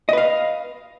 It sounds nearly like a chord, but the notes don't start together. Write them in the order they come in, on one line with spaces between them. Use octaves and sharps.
D#5 B4 F5